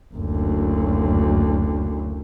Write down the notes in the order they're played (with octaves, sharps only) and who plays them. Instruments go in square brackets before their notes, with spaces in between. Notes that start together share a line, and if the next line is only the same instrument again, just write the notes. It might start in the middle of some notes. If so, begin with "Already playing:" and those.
[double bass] F#1 D2